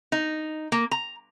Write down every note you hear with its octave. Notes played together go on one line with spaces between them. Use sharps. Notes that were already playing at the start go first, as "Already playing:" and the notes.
D#4
A#3
A#5